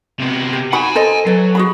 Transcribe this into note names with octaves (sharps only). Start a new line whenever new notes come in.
C3 B3
G4
D#4 F#4 F#5 G#5 B5
A4 C5 D#5
F#3 A4 B4
F#4 G#4 B5